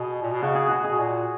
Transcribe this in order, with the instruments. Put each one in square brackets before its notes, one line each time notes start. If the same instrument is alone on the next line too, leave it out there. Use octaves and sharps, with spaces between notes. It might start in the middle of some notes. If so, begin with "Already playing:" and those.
Already playing: [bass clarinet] B2 [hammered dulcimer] G#4
[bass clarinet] A#2
B2
[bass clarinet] C#3 [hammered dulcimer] F#4
[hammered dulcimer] G#4
[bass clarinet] B2 [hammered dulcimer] F#4
[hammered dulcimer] G#4
[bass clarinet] B2
A#2